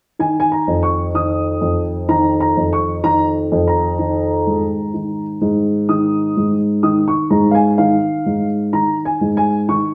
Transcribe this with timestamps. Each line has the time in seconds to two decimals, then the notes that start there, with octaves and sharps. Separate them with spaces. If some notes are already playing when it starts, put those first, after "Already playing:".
0.19 D#3 G#5
0.40 G#5
0.52 A#5
0.68 F2
0.83 C#6
1.14 D#3 D#6
1.61 F2
2.09 D#3 A#5
2.40 A#5
2.57 F2
2.73 C#6
3.04 D#3 A#5
3.52 F2
3.68 A#5
3.99 D#3
4.47 G#2
4.94 D#3
5.41 G#2
5.89 D#3 D#6
6.37 G#2
6.83 D#3 D#6
7.08 C#6
7.31 G#2 A#5
7.51 F5
7.55 G#5
7.78 D#3 F5
8.26 G#2
8.73 D#3 A#5
9.05 G#5
9.21 G#2
9.37 G#5
9.69 D#3 C#6